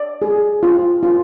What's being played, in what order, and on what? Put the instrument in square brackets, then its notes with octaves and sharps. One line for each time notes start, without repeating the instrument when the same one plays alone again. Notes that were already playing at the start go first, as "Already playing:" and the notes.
Already playing: [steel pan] D5
G#4
F4
F4